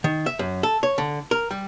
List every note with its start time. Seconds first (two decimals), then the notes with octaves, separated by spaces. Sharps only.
0.04 D#3
0.26 E5
0.39 F#2
0.63 A4
0.83 C#5
0.98 D3
1.31 A#4
1.51 G3